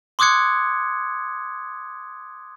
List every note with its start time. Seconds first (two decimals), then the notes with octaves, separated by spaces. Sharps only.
0.19 C6 D6 D#6 F#6 G#6 C#7